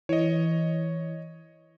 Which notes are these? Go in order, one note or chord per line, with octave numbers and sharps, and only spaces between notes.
E3 C#5 D#5